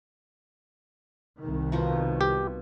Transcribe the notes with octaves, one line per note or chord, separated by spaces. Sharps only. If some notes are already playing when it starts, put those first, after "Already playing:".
C2 D#3
B2 F3 A#5
G4